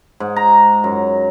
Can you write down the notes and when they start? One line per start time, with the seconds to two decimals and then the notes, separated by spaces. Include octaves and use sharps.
0.20 G#2
0.36 A#5
0.84 F#2